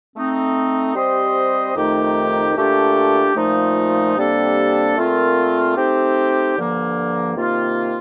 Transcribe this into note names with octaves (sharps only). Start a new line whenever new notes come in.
A3 C4 D#4
G3 C4 G4 C5 D#5
F2 D#3 A3 D#4 G4
A#2 A3 D4 G4
A#2 F3 A3 D#4
C3 G3 A#3 D4 A4
A#2 A3 C4 F4 A#4
A3 C4 D#4 G4
G2 D3 F3 A#3
C3 D#3 A#3 F4